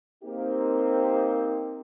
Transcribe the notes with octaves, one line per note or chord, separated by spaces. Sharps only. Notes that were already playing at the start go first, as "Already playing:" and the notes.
A#3 C4 D#4 G4